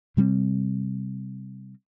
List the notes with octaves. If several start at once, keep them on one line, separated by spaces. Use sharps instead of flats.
C3 G3 B3 C4